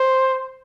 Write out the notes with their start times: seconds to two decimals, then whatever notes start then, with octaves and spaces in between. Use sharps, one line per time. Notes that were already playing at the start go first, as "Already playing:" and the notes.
Already playing: C5